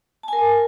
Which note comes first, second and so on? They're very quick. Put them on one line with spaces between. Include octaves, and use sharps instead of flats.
A5 G#5 A#4